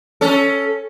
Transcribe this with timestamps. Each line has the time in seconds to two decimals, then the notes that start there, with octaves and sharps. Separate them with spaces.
0.21 C#4 A4